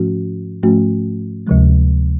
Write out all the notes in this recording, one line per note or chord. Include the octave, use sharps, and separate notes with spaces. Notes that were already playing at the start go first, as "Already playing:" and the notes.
Already playing: G#2 F3 A3 C#4 F#4
G#2 F3 A3 C#4 F#4
D2 C3 F3 G#3